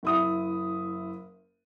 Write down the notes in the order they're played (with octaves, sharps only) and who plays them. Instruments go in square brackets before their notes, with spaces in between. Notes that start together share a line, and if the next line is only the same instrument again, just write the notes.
[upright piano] F#1 E4 D#6